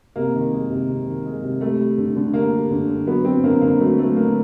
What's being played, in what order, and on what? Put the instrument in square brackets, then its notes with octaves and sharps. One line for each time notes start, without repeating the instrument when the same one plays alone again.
[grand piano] C3 A#3
D#3
G#3
C3
C3
D#3
G#3
C3
G3 A3
G3
D3
D3
G3 A#3
G3
D3
D3
F#3 B3
F#3 C4
D3 A#3
D3 A#3
F#3 A3
F#3 A3
D3 A#3